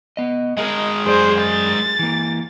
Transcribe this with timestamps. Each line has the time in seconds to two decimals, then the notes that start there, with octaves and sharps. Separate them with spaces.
0.17 B3 D#5
0.57 G#3 A#4 D#5
1.06 F#2 G#4 C5 D5
1.42 A6
1.99 E3 A#3